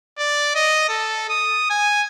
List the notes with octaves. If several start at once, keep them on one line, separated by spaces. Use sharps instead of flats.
D5
D#5
A4
D#6
G#5